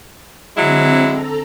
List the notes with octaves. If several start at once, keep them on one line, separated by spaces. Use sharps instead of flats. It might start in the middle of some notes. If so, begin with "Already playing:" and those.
D3 F#3 G#3 C4 E4
A4 A#5